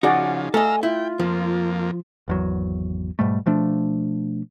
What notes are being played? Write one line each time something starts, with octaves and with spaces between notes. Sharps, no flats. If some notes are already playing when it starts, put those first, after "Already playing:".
C#3 F3 D#4 F#4 G#4 D5 F#5
A3 A4 D#5 F5 G#5 A#5 E6
E4 F4 G5
F2 F3 A#3
G#1 E2 F#3
G#2 B2 G3 A3
B2 F3 A3 D4